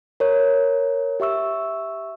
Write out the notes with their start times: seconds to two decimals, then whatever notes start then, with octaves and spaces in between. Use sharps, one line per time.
0.20 A#4 C#5
1.20 G4 E5 C#6 E6